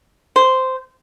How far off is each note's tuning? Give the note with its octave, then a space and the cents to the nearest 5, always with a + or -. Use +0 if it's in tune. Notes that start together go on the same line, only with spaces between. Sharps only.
C5 -10